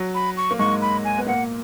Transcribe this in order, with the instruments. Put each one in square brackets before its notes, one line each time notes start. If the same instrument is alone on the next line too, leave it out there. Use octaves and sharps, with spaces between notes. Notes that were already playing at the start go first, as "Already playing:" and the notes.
Already playing: [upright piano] F#3
[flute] B5
C#6
[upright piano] A#3
[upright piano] G#2 G#3 [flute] C#6
[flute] B5
G#5
[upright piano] B3
[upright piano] A#2 A#3 [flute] F#5